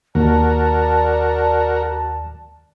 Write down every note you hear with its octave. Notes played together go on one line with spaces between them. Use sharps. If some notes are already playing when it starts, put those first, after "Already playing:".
D#2 F#4 A#4 D5 A5